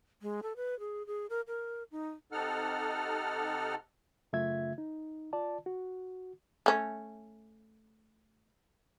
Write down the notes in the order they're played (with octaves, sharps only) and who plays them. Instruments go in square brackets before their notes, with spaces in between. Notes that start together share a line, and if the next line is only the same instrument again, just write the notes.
[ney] G#3
A4
B4
G#4
G#4
A#4
A#4
D#4
[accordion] C3 D#4 A4 F#5 F6
[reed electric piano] F#2 C#3 A3 F4 E5 G#6
D#4
F4 D5 A5
F#4
[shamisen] A3 C#4